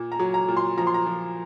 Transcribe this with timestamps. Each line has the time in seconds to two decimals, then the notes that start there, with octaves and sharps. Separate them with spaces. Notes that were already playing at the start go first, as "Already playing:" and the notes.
Already playing: A#2
0.12 A#5
0.19 F#3
0.34 A#5
0.48 A#2
0.57 C6
0.78 F3 A#5
0.87 C6
0.94 A#5
1.06 F3